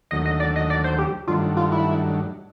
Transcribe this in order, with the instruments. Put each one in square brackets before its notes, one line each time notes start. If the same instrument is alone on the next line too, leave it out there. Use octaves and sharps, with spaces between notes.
[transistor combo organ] D#2 D3 F#3 A3 [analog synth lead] D#5
[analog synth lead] D#5
D5
D#5
D5
C5
G4
[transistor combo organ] G2 D#3 F#3 A3 D4 [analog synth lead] F4
[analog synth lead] F4
E4